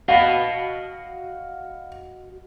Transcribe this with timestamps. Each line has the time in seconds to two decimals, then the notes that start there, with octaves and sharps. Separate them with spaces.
0.08 F#4 D#5 F5 F#5